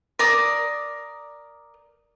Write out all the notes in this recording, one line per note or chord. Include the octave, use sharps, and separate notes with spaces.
A#4 D5 D#6